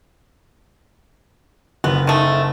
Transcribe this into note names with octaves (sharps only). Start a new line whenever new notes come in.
F#1 B3
D#3 A3